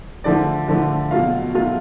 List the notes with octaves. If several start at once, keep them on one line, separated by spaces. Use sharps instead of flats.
D3 F3 A3 D5
D3 F3 A3
B2 F#3 A3 F4 F5
B2 F#3 A3 F4